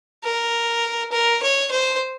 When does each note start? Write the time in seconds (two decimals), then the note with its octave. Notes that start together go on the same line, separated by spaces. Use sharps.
0.24 A#4
1.12 A#4
1.42 C#5
1.71 C5